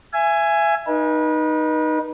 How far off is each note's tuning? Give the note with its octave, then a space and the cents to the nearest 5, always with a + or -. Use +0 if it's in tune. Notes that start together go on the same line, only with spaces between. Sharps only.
E5 +30 G#5 +0
D#4 -10 B4 -35